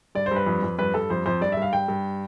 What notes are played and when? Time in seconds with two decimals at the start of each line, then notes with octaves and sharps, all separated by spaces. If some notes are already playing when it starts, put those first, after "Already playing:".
0.15 G2 D5
0.26 C5
0.31 G2 B4
0.47 F2
0.63 F2
0.79 G2 B4
0.94 G2 A4
1.10 F2 C5
1.26 F2 C5
1.41 G2 D5
1.52 E5
1.57 G2 F5
1.73 G2 G5
1.88 G2